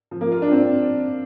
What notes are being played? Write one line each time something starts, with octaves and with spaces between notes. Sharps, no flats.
F3
A#3
F4
D4
C4